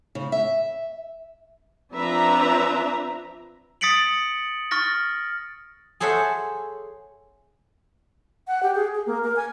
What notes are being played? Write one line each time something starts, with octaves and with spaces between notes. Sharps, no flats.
C#3
E5
F3 C4 D4 B4 E5 A#5
D#6 A6 B6 C#7 D7 F#7
C#6 F6 A6 A#6
G#4 A4 C5 C#5 E5 F#5
F#5
G4
G#4
G#4
A#3
A#4
G#5